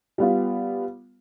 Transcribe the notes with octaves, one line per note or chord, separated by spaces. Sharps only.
G3 B3 F4